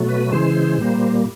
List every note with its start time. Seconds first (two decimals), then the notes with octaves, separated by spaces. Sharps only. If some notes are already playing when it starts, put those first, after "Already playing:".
Already playing: B2 F#3 A3
0.09 B4
0.32 C#3 E3 G#3 C5
0.78 A#2 G3 A#3